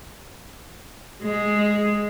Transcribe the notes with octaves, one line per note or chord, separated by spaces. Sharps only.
G#3